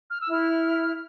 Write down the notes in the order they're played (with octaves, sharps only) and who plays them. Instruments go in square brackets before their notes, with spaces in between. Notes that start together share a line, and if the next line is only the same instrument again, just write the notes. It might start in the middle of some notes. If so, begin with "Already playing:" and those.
[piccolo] F6
E6
[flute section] E4 [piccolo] F6